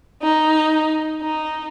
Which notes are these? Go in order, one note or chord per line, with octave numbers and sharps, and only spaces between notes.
D#4
D#4